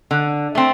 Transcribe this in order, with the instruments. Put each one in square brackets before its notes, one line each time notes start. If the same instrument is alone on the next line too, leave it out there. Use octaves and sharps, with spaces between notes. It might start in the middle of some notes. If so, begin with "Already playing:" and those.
[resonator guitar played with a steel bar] D3
A3 C4